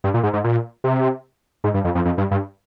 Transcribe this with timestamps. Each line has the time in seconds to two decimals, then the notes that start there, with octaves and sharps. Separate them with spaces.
0.04 G2
0.14 A#2
0.23 G#2
0.33 G#2
0.44 A#2
0.84 C3
1.64 G#2
1.74 G2
1.85 F2
1.95 F2
2.05 F2
2.18 G2
2.31 G2